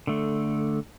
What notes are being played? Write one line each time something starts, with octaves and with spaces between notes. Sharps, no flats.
D3 A3